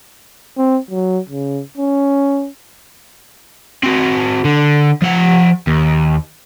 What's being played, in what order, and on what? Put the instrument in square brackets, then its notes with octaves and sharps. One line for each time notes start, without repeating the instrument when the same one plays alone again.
[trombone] C4
F#3
C#3
C#4
[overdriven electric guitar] C4 F#4
D3
F3 F#5
D#2